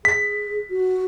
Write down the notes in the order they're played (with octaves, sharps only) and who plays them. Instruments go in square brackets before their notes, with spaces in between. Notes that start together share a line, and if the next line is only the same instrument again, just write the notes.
[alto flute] G#4 [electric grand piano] B6
[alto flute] F#4